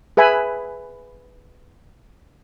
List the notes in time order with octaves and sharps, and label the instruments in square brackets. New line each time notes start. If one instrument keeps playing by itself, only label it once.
[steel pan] G#4 B4 E5 G#5 B5